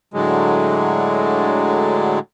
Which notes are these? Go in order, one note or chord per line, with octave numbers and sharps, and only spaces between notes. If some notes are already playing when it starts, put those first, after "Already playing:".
A2 D3 F#3 G#3